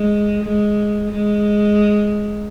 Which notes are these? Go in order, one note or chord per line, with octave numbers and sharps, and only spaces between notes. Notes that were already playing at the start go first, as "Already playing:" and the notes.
Already playing: G#3
G#3
G#3